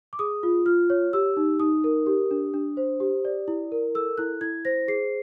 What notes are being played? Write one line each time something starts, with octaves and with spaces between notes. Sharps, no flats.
D6
G#4 D#6
F4
F4 F6
C#5
G4 E6
D#4
D#4 D#6
A#4
G4
D4
D4
C5
G4
D5
E4
A#4
A4 E6
E4 F#6
E4 G#6
C5 A#6
G#4 C7